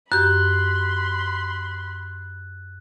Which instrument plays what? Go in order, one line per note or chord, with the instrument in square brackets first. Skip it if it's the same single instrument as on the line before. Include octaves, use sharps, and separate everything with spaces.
[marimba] F#2 G4 G6 [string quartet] B5 C6 [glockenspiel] F#6